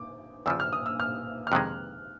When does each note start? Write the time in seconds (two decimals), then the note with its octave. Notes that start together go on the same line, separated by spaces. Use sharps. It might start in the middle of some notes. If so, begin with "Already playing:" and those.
Already playing: D6
0.46 E2 C#3 F3 E6
0.60 F6
0.73 D#6
0.86 E6
1.00 F6
1.47 F6
1.52 F2 C3 D#3 G#3 F#6